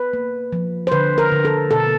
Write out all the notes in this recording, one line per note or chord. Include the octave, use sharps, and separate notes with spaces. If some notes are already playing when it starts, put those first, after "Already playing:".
Already playing: B4
A#3
F3
C5
D3 B4
A#4
D3
A4
B2 A4